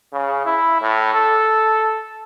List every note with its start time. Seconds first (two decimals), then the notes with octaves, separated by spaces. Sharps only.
0.12 C#3
0.45 E4
0.82 A2
1.14 A4